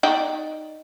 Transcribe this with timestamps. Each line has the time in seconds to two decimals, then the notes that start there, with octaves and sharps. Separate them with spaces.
0.03 D#4 D5 G5